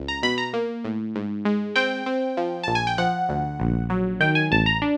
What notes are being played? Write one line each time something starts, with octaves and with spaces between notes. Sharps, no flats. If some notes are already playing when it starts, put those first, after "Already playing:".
Already playing: C#2
A#5
B2 B5
A#5
A#3
A2
G#2
G#3
C4 G5
C4
F3
A#1 A5
G#5
G5
F3 F#5
D2
A#1
F#3
D#3 G5
G#5
A1 A5
A#5
D4